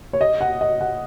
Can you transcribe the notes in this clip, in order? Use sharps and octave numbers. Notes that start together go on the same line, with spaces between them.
C#5
D#5
F#5
D#5
F#5